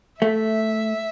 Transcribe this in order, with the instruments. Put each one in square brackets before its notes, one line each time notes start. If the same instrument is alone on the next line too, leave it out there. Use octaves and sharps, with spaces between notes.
[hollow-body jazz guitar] A3 [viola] E5